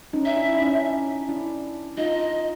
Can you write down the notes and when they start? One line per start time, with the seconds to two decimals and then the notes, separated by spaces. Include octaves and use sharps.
0.13 C#4 D#4
0.25 E5
0.36 D4 E4
0.49 E4
0.60 C#4 D#4
1.29 D4 E4
1.97 D#4 F4 D#5